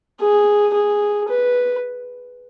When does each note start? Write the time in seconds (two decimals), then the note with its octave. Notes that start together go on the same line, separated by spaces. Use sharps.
0.20 G#4
0.74 G#4
1.29 B4